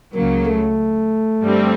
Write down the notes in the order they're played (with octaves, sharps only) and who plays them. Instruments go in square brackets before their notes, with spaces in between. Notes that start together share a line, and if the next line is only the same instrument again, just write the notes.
[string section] C#2 C#3 F#3 [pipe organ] A#3
[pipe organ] A3
[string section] G2 D3 G3 C4